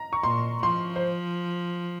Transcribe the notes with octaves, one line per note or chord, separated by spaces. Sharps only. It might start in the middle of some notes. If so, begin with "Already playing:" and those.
Already playing: A#5
C#6
A#2 C6
F3 C6
C5